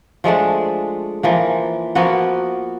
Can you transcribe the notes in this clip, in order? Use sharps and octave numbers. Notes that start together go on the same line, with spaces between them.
F3 G#3 A3 D4
E3 F3 A#3
F3 A#3 B3 F#4